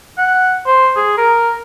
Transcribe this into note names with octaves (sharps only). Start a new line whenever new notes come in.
F#5
C5
G#4
A#4